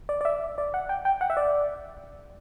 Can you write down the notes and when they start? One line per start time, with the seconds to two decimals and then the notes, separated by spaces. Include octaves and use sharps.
0.09 D5
0.21 D5
0.25 E5
0.58 D5
0.74 F#5
0.89 G5
1.05 G5
1.21 F#5
1.30 E5
1.37 D5